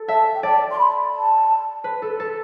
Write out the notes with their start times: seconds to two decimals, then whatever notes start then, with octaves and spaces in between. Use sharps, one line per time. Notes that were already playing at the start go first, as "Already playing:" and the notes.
Already playing: A4
0.08 E5 A5
0.35 G5
0.43 D5 A5
0.71 C6
0.79 B5
1.14 A5
1.84 B4
2.02 A4
2.20 A4